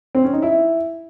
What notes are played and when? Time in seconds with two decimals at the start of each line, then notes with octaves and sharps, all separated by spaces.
0.15 C4
0.24 C#4
0.33 D#4
0.42 E4